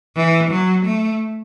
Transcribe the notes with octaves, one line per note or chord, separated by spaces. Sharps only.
E3
F#3
A3